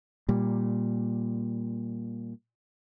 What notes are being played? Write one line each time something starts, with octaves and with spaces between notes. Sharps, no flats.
A#2 G3